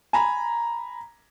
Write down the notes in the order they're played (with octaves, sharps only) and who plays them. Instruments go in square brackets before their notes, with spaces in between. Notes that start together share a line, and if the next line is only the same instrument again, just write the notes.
[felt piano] G#5 A#5 B5